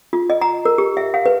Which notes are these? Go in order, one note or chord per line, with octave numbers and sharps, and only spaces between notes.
F4
D#5
A#5
A#4
G4
E5
F5
B4